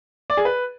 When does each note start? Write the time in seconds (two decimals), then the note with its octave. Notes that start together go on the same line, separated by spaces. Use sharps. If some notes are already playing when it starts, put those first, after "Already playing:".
0.30 D5
0.37 G#4
0.45 B4